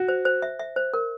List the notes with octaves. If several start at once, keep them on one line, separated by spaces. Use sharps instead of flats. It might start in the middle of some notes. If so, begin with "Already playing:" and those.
Already playing: F#4
C5
C5
E5
E5
C5
A#4